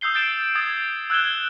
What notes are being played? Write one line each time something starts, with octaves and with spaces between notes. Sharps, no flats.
D#6 E6 G6 C7 G7
E6 G6 A6 D7 E7
D#6 G#6 A6
E6 F#6 G#6 E7 G7